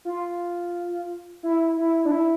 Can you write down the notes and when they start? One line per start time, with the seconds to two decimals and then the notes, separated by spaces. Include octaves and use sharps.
0.05 F4
1.43 E4
1.77 E4
2.05 D4
2.12 E4